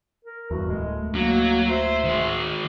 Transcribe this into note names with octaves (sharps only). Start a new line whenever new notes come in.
A#4
E2 G2 F#4
D1 A2 G#3
F#3 A#3
C5 E5
D#3 G#3